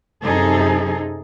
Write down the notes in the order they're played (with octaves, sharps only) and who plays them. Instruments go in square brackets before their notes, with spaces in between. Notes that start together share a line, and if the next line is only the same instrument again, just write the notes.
[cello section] F#2 C3 D#4 G#4 A4